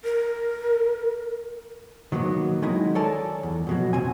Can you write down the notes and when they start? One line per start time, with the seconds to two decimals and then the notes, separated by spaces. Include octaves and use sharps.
0.04 A#4
2.12 D#3 F#3 A#3 B3
2.62 D#3 F#3 G#3 D#4 E4
2.95 A4 A#4 C#5 D5 G#5 A5
3.43 E2
3.67 F2 B2 F#3
3.93 C#2 C4 G#5